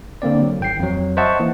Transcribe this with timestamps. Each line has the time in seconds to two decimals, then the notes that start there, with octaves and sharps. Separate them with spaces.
0.22 D3 A#3 C4 D5
0.42 F#3
0.60 G#1 G5 C7
0.79 F2 F#3
1.17 C5 D#5 E5 F#5 A5 C#6
1.40 E3 A#3